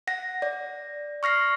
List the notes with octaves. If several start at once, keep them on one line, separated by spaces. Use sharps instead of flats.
F#5 A#6
D5
C#6 F6 A#6 C7